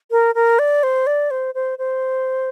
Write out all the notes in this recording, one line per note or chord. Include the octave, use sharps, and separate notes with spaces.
A#4
A#4
D5
C5
D5
C5
C5
C5